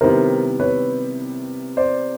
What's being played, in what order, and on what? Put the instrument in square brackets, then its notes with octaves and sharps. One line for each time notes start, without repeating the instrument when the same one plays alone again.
[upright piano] C3 D#3 G3 B3 E4 [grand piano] A#4 C5
[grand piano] B4 C#5
C5 D5